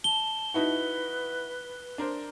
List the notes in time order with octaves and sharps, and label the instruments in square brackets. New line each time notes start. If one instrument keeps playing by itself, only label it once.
[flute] A5 [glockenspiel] G7
[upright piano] D#4 E4 F#4 [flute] B4
[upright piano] D4 A#4 C5